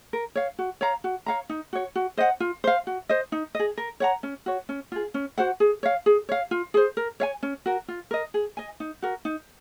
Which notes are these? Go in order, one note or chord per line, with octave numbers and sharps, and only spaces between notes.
A#4
C#5 F5
F#4
C#5 F5 A#5
F#4
C#5 F5 A#5
D#4
F#4 C#5
F#4
C5 D#5 F#5
F4
C5 F5
F#4
C5 D#5
D#4
G#4 D#5
A#4
C#5 F#5 A#5
C#4
F#4 C#5
C#4
F4 G#4
C#4
F#4 C5 F#5
G#4
C#5 F5
G#4
C#5 F5
F4
G#4 C5
A#4
C#5 F5 G#5
C#4
F#4 A#4
F4
A#4 D#5
G#4
D#5 G#5
D#4
F#4 A#4
D#4